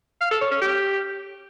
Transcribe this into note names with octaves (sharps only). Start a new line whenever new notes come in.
F5
A4
C#5
C#4
G4